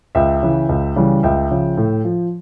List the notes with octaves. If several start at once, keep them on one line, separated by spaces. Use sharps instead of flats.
C#2 E5 G5
C#3 E3
C#2
C#3 E3 G3
C#2 E5 G5
C#3 F3
A2
F3